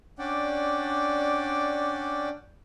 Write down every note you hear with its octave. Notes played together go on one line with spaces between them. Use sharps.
C#4 D4 D5 F#5 G5